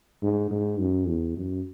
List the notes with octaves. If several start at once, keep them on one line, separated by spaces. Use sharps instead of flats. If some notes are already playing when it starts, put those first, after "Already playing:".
G#2
G#2
F#2
E2
F#2